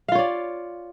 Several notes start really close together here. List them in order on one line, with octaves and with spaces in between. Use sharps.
F5 F4 C#5 D5